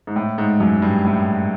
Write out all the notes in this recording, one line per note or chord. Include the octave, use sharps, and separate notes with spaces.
G#2
A2
G#2
F#2
G2
A2